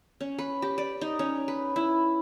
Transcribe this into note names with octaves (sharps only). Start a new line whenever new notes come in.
C#4
B4
G4
D5
D#4
C#4
B4
E4